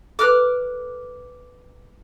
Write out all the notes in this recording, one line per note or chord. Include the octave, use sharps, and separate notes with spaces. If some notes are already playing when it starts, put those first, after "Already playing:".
A4 B4 D6 F6 F#6